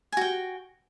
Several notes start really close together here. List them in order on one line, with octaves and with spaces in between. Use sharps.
G#5 F#4 G5